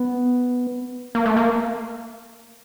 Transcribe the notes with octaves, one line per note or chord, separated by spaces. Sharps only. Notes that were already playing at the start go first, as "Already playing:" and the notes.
Already playing: B3
A#3
A3
A#3